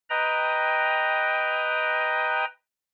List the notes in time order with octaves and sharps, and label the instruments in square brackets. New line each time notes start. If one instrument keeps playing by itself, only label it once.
[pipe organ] B4 D#5 G5 A#5